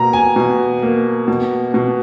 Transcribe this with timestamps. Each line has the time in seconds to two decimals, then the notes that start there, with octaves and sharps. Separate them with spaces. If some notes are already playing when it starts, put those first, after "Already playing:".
Already playing: B2 A#3 A#5
0.13 G#5
0.36 B2
0.82 A#3
1.28 B2
1.74 B2